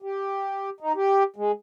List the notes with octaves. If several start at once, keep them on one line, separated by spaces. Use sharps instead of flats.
G4
D#4
G4
G#3